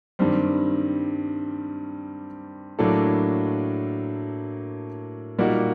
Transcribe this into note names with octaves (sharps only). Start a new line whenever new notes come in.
G2 D#3 G3 C4
A2 F#3 A#3 D4 A4
A#2 G3 A#3 D#4 F#4